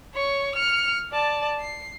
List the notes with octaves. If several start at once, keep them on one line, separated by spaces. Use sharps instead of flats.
C#5 C#6
F6 C#7
D5 A5
C7